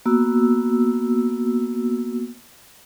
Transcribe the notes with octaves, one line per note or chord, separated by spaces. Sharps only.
A#3 B3 F#4 E6